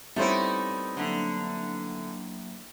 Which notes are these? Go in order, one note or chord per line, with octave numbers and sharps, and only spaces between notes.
G3 A3 B3 C4 D#4 E4 C5 C#5
D3 F#3 A#3 E5